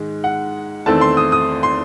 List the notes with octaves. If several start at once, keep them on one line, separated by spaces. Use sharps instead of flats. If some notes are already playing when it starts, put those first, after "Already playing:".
Already playing: G#2 D#3 G#3
F#5
E2 D#3 A3 C4 A5
C6
D#6
D#6
C6